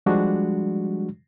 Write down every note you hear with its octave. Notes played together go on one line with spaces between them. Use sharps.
F3 G3 G#3 D4 F#4